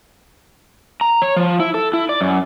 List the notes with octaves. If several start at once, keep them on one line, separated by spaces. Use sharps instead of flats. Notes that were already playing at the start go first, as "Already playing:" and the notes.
A#5
C#5
F3
E4
A4
E4
D5
F#2